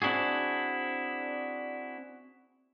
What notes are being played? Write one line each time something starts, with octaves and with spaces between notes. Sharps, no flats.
C4 D4 E4 F#4 G#4